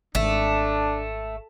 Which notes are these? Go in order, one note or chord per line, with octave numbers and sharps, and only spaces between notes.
G#1 A3 D4